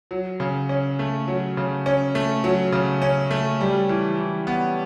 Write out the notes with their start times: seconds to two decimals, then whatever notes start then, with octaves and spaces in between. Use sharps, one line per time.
0.11 F#3
0.40 C#3
0.69 C#4
0.99 A3
1.28 F#3
1.57 C#3
1.86 C#4
2.15 A3
2.44 F#3
2.72 C#3
3.02 C#4
3.31 A3
3.61 G3
3.89 E3
4.18 E3
4.47 B3